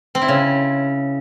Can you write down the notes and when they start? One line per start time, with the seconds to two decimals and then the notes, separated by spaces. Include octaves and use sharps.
0.15 C4
0.22 E4
0.28 C#3